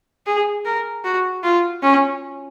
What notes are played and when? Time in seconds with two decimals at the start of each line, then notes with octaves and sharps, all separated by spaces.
0.26 G#4
0.65 A#4
1.04 F#4
1.43 F4
1.83 C#4